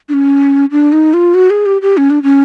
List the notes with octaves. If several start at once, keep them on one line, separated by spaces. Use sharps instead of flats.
D4
C#4
D4
D#4
F4
F#4
G#4
G4
G4
C#4
D4
C#4